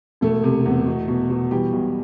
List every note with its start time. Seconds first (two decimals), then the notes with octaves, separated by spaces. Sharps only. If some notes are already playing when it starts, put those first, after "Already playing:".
0.21 E1 A3 A4
0.43 C3
0.66 E2
0.86 B2
1.08 B2
1.30 B2
1.51 E3 G3 G4
1.73 B1